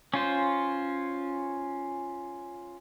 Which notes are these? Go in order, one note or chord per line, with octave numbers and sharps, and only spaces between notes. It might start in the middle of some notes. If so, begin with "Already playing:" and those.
C#4 F4 C5